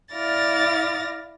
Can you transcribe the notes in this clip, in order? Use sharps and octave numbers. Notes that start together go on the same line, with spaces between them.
E4 D5 F5 F6 A6 A#6